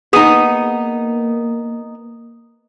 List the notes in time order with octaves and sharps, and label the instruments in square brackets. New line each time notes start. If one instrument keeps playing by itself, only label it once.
[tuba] A#3 [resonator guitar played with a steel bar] B3 D#4 [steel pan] G#4 D#6